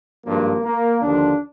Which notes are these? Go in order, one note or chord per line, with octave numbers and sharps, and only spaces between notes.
G#1 G2 F3 A#3
A#3
D#2 D3 F3 D4